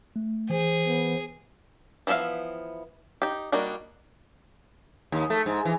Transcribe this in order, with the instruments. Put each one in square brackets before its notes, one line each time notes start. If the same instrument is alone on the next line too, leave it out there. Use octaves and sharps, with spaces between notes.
[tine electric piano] A3
[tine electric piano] E3 [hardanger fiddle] G#4 [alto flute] C5
[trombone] B3
[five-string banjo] E3 F3 B3 E5 F5
D#4 G4
G3 A#3 D4 D#4 F#4
[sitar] D#2
A3
G#2
E3